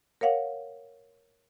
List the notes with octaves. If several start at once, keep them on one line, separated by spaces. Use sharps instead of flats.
A#4 C#5 F5 F#5